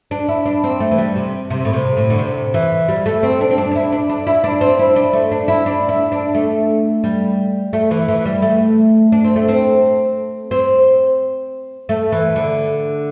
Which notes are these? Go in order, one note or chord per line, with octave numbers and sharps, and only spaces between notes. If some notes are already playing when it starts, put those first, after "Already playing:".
D4
E4
D4
C4
A3
E3
G3
C3
C3
A2
C3
A2
D3
C3
E3
G3
A3
C4
D4
C4
D4
D4
E4
D4
D4
E4
D4
C4
E4
D4
A3
D4
E4
D4
E4
D4
A3
G3
A3
E3
E3
G3
A3
D4
C4
A3
C4
C4
A3
E3
D3